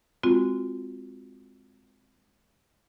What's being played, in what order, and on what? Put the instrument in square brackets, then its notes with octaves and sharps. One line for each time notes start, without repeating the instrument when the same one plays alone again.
[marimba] G#3 C4 F4 F#4